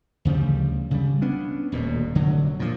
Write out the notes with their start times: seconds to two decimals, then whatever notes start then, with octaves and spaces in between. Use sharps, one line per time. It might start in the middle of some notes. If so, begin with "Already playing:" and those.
0.25 D2 C#3 F3 G3
0.91 C#3 G3
1.22 B3 C#4 D4
1.72 D#1 D2 B2
2.15 F1 D3 F#3
2.60 A#2 F3